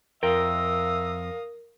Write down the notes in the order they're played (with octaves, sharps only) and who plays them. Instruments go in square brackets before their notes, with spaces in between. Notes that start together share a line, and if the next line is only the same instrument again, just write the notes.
[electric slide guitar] F2 F4 G5 [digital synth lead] A#4 [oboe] E5 [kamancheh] F5 D#6